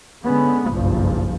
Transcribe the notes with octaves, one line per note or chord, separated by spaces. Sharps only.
D3 G#3 B3 C#4
F#1 B1 G2 F3